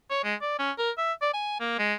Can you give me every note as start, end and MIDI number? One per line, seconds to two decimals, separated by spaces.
0.10 0.20 73
0.24 0.35 56
0.42 0.57 74
0.59 0.71 61
0.78 0.90 70
0.97 1.13 76
1.22 1.30 74
1.33 1.58 80
1.60 1.75 58
1.79 1.94 56